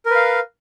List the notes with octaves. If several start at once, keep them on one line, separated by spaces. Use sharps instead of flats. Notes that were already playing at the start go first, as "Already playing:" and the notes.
A#4 B4 F5